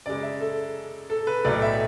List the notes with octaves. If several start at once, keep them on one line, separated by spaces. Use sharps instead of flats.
F#2 C#3 G#3 D5
E5
A4
A4
B4
B1 A2 F#3 A3 D5
E5